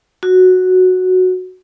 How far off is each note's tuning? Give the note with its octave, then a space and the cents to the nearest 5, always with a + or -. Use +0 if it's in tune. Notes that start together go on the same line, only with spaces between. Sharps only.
F#4 -5